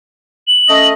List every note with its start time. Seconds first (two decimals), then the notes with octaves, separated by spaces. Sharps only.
0.48 F#7
0.69 A3 C#4 D#5